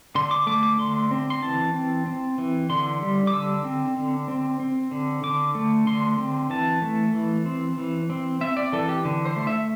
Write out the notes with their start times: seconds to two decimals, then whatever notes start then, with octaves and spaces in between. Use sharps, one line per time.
0.15 D3 C6
0.31 D6
0.47 A3 D6
0.63 D6
0.79 D3 C6
1.11 C4
1.30 C6
1.42 E3 A5
1.74 C4
2.06 C4
2.38 E3
2.69 D3 C6
3.02 G3
3.27 D6
3.33 D3 E6
3.64 C4
3.97 D3
4.28 C4
4.60 C4
4.91 D3
5.23 D3 D6
5.55 A3
5.87 D3 C6
6.19 C4
6.50 E3 A5
6.82 A3
7.14 E3
7.46 C4
7.78 E3
8.10 C4
8.41 C4 E5
8.57 D5
8.72 E3 A4
8.89 G4
9.05 D3
9.25 C5
9.36 A3
9.47 E5